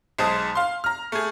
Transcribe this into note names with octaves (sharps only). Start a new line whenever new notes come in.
B1 G#3 C5 A5 D#6
F5 C6
A#5 F6
A3 G#4